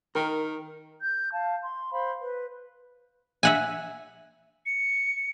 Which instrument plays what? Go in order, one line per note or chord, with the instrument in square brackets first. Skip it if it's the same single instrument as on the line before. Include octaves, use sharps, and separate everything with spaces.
[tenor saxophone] D#3 [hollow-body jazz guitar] A#4
[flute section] G6
F5 A5
C6
C5 F5 B5 C6
B4
[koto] E5 F#5 G#5
[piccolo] C#7